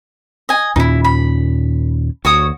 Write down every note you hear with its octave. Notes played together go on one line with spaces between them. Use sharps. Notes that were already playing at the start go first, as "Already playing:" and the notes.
D#5 G#5
D#2 A#2 C#4 D#4 E4
B5
D2 F#4 C#5 D#6